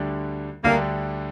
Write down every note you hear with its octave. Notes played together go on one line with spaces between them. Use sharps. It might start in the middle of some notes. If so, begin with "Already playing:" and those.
Already playing: D2 D3 G3 D4 G4
D2 D3 G3 A#3 D4 G4